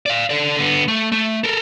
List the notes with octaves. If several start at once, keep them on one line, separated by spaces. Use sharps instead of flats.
D5 F5
A4 D5
D3 B3
A3
A3
A4 A#4